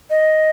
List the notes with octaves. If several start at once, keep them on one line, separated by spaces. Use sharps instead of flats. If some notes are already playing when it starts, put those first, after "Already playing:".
D#5